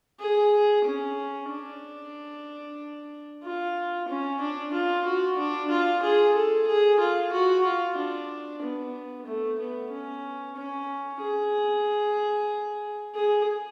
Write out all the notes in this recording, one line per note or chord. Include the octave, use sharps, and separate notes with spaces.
G#4
C#4
D4
F4
C#4
D4
F4
F#4
D4
F4
G#4
A4
G#4
F4
F#4
F4
D4
B3
A3
B3
C#4
C#4
G#4
G#4